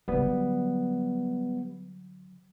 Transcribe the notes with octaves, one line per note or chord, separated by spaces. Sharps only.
D3 F#3 G3 B3